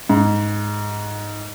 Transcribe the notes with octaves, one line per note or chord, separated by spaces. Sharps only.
G#2